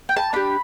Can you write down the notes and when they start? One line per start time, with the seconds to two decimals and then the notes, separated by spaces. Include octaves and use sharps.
0.09 G5
0.17 A5
0.33 D4 G4 B5